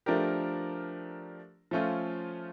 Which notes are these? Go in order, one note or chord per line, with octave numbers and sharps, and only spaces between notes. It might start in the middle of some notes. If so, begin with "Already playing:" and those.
F3 A3 D4 G4 A#4
F3 A3 C#4 F4 A4